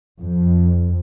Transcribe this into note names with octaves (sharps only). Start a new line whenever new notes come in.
F2